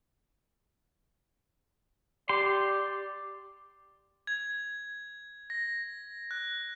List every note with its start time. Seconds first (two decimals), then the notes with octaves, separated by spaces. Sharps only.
2.29 G4 D5 C6
4.27 G#6
5.50 A#6
6.31 F#6